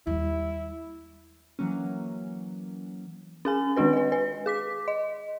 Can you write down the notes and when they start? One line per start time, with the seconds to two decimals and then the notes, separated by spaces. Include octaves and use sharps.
0.07 D#2 G3 E4
1.59 E3 F#3 A#3 C#4
3.45 C#4 G#4 G#5
3.76 D#3 G#3 D4 F#4 B4
3.93 B4 D#5
4.12 B4
4.46 G#4 D6 B6
4.88 D#5